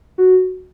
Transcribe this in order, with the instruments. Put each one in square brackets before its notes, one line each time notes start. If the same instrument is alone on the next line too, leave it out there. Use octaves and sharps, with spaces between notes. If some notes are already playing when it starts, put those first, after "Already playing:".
[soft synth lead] F#4